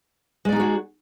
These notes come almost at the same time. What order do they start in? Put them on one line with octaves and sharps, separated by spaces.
G#3 D5 D#4 G#4 F#4